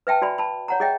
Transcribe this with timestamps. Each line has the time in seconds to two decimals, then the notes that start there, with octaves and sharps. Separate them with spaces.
0.07 B4 E5 G5 A5
0.22 F#4 D5 G#5 B5
0.38 A5 B5
0.68 C#5 F#5 A#5
0.80 G#4 C#5 D#5 E5 G5